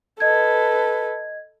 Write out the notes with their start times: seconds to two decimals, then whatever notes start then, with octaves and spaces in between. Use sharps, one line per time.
0.20 A4 B4 D#5 G#6